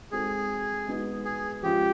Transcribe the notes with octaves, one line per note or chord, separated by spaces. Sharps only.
G#3 C4 D#4 F#4 G#4 A4
G#3 B3 D#4 F#4
G#4
F3 G#3 C#4 F4 G4